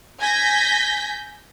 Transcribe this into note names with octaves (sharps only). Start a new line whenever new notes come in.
G#5 G6 G#6 A#6 B6